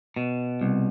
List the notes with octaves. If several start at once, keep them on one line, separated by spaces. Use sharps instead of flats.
B2
C2